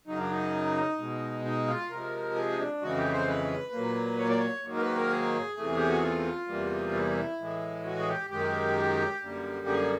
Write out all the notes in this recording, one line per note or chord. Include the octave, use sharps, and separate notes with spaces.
F#2 C#3 F#3 D#4
D4
D#4
B2 G#3
D#4
F4
C3 F3 G#3 A#4
G#4
D#4
D4
F2 C#3 E3 G#3 F#4
G4
C5
B4
A#2 F#3 A#3
C#5
D5
C#5
G#2 D#3 F#3 A#3
A#4
B4
A#4
G#4
E2 C3 E3 A3
G4
F#4
F4
E2 C3 E3 G3 A#3
E4
A2 E3 G#3
F#4
G#4
G4
F#2 D#3 G#3 G4
F#2 D3 G3 A#3
G#4